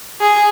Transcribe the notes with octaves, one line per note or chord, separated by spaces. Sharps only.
G#4